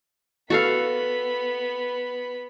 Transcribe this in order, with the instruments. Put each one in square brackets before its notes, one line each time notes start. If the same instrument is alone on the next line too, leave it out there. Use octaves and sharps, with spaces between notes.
[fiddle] B3 B5 [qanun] F#4 A4 F5